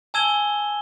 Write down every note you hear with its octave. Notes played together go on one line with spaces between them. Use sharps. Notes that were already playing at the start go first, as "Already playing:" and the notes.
G#5 A5 E6 G#6 E7 G7